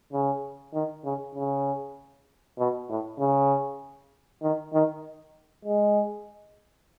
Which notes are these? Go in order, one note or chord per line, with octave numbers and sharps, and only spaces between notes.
C#3
D#3
C#3
C#3
B2
A2
C#3
D#3
D#3
G#3